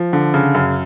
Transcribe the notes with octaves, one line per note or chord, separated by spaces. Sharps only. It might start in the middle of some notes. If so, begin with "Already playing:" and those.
Already playing: F3
D3
C#3
F#2